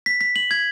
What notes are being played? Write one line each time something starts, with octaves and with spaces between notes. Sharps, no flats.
B6
B6
F#7
G#6